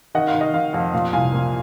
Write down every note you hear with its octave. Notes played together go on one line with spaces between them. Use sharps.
D#3 D#5 F#5
F5
D#3
D#5
D#3 F5
F2 F5
A#2 F5
C2 F5 G#5
A#2